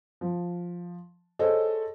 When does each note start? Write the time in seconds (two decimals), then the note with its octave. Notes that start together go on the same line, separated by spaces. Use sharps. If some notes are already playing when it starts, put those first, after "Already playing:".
0.21 F3
1.39 G#4 A4 C5 C#5 D#5